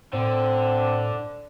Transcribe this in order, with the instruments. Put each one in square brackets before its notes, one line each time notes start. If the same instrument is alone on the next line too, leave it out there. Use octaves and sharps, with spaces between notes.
[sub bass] A2 [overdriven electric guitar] D3 [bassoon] C4 [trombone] D4